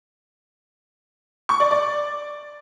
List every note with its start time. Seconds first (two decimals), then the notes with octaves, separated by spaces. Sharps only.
1.49 C#6
1.60 D5
1.71 D5